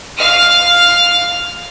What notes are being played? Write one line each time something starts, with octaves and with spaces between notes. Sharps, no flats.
F5 F6